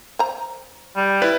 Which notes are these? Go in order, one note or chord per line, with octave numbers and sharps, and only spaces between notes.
C5 A#5
G3
E4 B4 D5